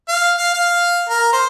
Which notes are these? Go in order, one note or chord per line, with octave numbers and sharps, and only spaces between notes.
F5
F5
F5
A#4
C5